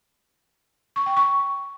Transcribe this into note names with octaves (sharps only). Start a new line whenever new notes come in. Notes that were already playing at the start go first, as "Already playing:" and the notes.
C#6
G5
C#6